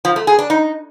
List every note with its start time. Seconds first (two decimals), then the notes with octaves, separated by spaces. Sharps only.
0.05 F3
0.16 A3
0.27 G#4
0.39 D4
0.50 D#4